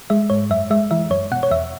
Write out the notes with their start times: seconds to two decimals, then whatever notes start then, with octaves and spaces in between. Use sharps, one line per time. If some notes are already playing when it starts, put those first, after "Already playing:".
0.10 G#3 E5
0.30 G#2 C#5
0.50 F#2 E5
0.70 G#3 E5
0.91 E3 E5
1.10 F#2 C#5
1.32 B2 F#5
1.43 C#5
1.51 E2 E5